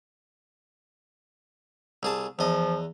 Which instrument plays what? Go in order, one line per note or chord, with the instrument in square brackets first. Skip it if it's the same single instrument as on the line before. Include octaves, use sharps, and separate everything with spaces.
[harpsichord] C2 G#4 A5
[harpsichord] E2 D#5 [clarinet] F3